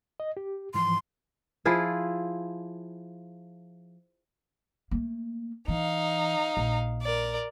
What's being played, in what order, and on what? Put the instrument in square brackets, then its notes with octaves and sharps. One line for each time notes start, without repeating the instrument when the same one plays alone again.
[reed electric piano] D#5
G4
[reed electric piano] G#2 E3 F3 [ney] C6
[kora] F3 E4 F4 G#4
[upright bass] A3 A#3
[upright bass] E3 [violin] D#4 F5
[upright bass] A#1
[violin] A#4 D5